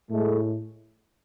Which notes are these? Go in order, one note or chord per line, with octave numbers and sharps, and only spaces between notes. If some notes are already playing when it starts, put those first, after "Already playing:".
A2 G#3 A3